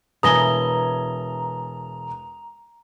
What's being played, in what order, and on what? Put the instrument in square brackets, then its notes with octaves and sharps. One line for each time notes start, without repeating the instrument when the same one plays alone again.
[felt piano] E1 G#5 [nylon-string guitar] E4 B4 [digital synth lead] A#5 [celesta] D#6 A#6 G7